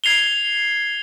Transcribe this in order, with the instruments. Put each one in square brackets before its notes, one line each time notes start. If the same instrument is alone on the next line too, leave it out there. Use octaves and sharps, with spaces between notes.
[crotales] G#6 C7 F7 G7